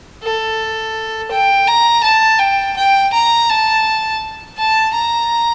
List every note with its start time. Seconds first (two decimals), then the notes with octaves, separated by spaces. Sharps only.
0.23 A4
1.31 G5
1.67 A#5
2.04 A5
2.40 G5
2.76 G5
3.13 A#5
3.49 A5
4.58 A5
4.94 A#5